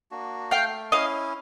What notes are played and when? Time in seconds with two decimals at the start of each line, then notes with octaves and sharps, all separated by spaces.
0.11 A#3 D4 F#4
0.51 A3 F5 G5
0.92 C#4 E4 D#5 F5